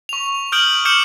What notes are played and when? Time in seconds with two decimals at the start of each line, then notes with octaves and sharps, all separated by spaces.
0.09 C#6 F7
0.52 D#6 F6 G6 D7 F#7
0.85 D6 F6 G6 C#7 E7 F#7